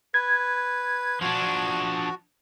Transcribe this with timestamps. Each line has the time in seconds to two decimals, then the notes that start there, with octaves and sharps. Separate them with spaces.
0.14 B4 G#6
1.21 F3 D4 F#4